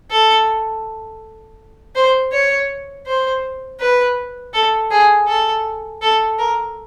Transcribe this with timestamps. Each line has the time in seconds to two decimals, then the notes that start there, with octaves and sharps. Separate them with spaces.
0.11 A4
1.96 C5
2.32 C#5
3.07 C5
3.81 B4
4.53 A4
4.91 G#4
5.28 A4
6.02 A4
6.39 A#4